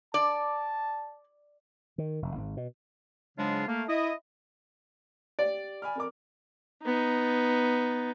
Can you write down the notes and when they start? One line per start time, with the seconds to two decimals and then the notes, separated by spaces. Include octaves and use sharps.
0.14 D5 A5
1.98 D#3
2.22 F1
2.36 G#1
2.57 B2
3.37 G#2 C#3 F#3 G#3 D4 F4
3.67 A3 A#3
3.89 E4 D#5
5.39 G4 D5
5.82 G#5 B5 F6
5.95 F2 A#4 D6
6.84 B3 D#4